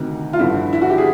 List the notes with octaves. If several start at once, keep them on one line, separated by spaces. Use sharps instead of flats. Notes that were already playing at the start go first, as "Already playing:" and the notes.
Already playing: D2 C3 D#3
F4
G1 G2 D3 F3 E4
E4
F#4
G4
G#4